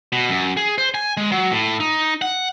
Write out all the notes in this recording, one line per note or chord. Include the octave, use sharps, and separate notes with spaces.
B2
F#2
G#4
C5
G#5
G#3
F#3
A2
D#4
F#5